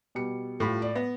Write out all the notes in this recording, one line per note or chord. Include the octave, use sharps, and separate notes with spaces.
B2 G3 C#7
A2 G3 F4 B5
D5
B3 A#6